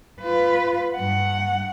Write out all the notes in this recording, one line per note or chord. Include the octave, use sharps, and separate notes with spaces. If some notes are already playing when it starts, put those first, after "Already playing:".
F4 B4
G2 F#5